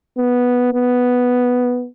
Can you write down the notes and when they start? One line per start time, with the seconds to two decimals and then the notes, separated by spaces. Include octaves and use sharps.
0.18 B3
0.73 B3